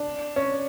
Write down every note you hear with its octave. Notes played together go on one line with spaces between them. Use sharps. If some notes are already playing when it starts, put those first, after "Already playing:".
Already playing: D4
C#4